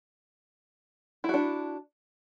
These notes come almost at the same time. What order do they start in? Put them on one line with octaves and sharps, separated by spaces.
E4 F#4 D4